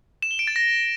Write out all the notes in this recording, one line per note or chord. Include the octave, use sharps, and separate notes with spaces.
E7
G7
D7
A6
A#6